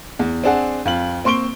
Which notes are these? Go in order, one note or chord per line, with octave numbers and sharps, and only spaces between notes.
E2
C4 D4 G#4 F#5
F2 F4 F#7
A#3 C4 C6 C#6 D7 G7